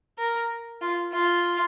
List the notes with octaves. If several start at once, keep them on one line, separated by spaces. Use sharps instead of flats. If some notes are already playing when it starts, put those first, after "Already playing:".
A#4
F4
F4